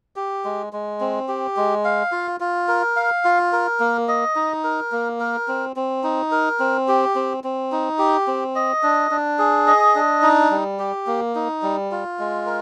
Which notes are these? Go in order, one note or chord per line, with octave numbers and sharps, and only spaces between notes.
G4
G#3
G#3
C4
G4
G#3
F5
F4
F4
A#4
F5
F4
A#4
A#3
D#5
D#4
A#4
A#3
A#4
C4
C4
D#4
A#4
C4
G4
C4
C4
D#4
G4
C4
D#5
D4
D4
G#4
D#5
D4
D#4
G3
G4
A#3
D#4
G3
F4
G#3
A#4